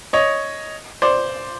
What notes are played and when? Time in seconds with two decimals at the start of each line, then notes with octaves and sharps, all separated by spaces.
0.13 C#5 D#5
1.02 C5 D5